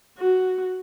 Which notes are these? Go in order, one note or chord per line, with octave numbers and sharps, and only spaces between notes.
F#4